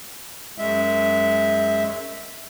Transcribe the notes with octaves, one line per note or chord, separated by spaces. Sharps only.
F#2 G#3 E5